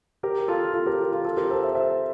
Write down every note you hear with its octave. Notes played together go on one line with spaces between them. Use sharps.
G4 A#4
F4 A4
F4 A4
G4 A#4
F4
F4 A4
F4 A4
G4 A#4
A4 C5
C5 E5
C5 E5